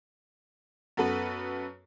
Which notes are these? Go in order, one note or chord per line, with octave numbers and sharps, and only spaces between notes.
F#2 B3 A4 B4